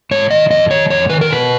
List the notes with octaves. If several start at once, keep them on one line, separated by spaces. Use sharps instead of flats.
G#2 C#5
D#3 D#5
F2 D#5
D#3 C#5
F2 C#5
D#3 B4
A#4
B2 B4